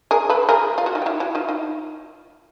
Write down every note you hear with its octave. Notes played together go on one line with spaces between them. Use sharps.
G#4 A#4
A4 B4
G#4 A#4
F4
F#4
D#4 F4
G4
E4 F#4
E4 F#4
D#4 F4
D#4 F4